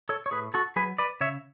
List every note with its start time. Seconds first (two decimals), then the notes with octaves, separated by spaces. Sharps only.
0.09 A4 C#5
0.26 C#5
0.31 A2 G#4 B4
0.54 F#4 A4
0.76 F#3 G#4 B4
0.98 B4 D5
1.21 C#3 C#5 E5